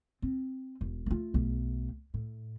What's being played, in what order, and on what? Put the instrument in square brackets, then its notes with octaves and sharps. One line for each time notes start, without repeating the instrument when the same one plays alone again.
[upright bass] C4
E1
A3 F4
B1 A3
A2